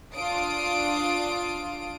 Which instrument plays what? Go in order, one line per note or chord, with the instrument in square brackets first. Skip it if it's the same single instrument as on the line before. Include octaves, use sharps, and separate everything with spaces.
[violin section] D4 F4 D#6 D7